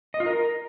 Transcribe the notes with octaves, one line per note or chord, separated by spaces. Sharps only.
D#5
F4
A#4